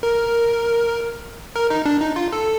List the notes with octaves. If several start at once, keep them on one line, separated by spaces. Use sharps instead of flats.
A#4
A#4
D#4
D4
D#4
F4
A4